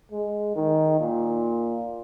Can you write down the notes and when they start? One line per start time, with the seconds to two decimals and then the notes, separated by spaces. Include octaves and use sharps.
0.12 G#3
0.56 D#3
1.00 A#2